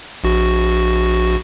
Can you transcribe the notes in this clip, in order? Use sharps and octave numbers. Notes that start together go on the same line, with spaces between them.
A#1 F#4